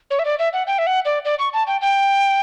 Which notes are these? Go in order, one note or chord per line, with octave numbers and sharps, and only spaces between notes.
C#5
E5
D5
E5
F#5
G5
E5
F#5
D5
D5
C#6
A5
G5
G5